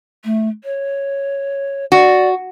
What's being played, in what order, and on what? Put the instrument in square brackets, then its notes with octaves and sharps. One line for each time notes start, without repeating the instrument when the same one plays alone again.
[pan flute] A3
C#5
[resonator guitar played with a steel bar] F#4 [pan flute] D5